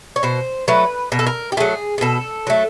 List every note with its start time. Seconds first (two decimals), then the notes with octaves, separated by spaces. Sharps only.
0.16 C#5
0.23 B2 C5
0.68 F#3 A3 B4
1.12 B2 A#4
1.19 A4
1.27 A#4
1.52 G4
1.57 F#3 A3 G#4
1.98 G#4
2.01 B2 A4
2.47 F#3 A3